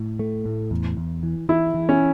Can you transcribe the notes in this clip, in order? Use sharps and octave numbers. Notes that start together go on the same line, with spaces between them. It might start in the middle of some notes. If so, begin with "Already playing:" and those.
Already playing: A2
A3
A2
E2
E2
E3
E3 E4
E3
C#4